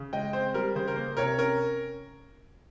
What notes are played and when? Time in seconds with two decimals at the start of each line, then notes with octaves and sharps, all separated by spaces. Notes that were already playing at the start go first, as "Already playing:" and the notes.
Already playing: C#3
0.13 G#3 D#5 G5
0.33 C4 C5
0.54 G3 A#4
0.75 C#3 C5
0.88 A#4
0.96 A#3 C5
1.17 C3 A#4 C#5
1.38 C#4 A#4